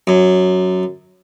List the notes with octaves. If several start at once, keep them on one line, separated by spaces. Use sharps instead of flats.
F#2